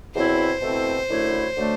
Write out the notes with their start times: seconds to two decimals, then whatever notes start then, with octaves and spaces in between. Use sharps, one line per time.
0.15 E2 B2 F#3 C4 E4 C5
0.62 B2 A3 C4 E4
1.09 F#2 D3 F#3 A3 E4
1.57 D3 F#3 A3 D4